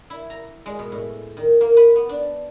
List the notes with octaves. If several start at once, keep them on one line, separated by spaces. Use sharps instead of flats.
E4
A#5
G#3
B2
A2
D#3
A#3
B4
B3
D4